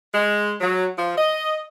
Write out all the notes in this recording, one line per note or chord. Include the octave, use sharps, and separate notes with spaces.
G#3
F#3
F3
D#5